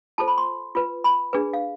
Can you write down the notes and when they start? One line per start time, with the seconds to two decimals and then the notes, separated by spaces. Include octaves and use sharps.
0.18 F4 A4 C5 A5
0.27 B5
0.38 C6
0.75 F4 B4
1.04 B5
1.33 D4 G#4 B4
1.53 F5